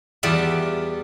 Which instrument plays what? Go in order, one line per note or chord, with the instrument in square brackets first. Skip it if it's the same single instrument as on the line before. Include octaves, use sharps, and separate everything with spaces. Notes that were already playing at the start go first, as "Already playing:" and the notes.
[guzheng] E2 G3 F4 G4 E5 F#5